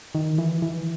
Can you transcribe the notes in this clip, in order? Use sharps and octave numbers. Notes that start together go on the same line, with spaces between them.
D#3
E3
E3